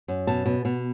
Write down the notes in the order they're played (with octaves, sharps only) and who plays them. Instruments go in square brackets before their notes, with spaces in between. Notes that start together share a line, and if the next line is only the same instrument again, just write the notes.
[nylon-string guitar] F#2
B2 A5
B2
B2